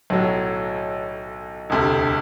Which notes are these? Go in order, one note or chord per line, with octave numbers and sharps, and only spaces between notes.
B1 A2 F#3
E1 D2 C3